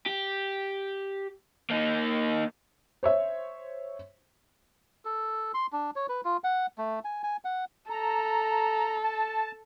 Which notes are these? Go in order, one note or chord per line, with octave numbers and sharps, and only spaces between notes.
G4
A#3 D#4
C5 C#5 E5
A4
C6
D4
C#5
B4
F4
F#5
A3
G#5
G#5
F#5
A4 A#5
A5